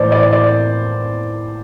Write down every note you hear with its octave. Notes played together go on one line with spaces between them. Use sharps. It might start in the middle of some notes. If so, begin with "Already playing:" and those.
Already playing: A2 E3 A3 C5 D5
D5
D5